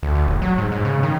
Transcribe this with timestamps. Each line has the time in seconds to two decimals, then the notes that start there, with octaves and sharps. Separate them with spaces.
0.03 D2
0.15 D2
0.27 D#1
0.42 F#3
0.58 G#2
0.72 G#2
0.85 C#3
1.03 D#3